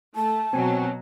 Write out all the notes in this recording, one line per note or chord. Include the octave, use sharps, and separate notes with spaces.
A3 A5
B2 F#3 C4 G#5